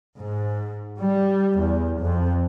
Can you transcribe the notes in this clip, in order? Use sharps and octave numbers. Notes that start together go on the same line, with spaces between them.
G#2
G3
E2
F2